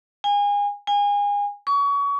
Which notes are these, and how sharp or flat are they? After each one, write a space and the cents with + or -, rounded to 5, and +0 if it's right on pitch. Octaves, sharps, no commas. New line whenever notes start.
G#5 -30
G#5 -30
C#6 +30